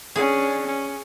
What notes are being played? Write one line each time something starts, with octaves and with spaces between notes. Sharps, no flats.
C#4 D4 G#4
C#4